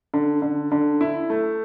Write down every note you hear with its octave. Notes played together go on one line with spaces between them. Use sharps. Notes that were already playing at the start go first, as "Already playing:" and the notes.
D3
D3
D3
E4
A3